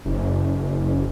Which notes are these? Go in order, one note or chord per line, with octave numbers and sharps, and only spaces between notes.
F#1